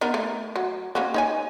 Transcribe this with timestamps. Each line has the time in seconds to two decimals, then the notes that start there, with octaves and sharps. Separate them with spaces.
0.01 B3 D#4 A#4
0.14 A3
0.56 F#3
0.95 A#3 C#4 F#4
1.14 D#4 C#5 G#5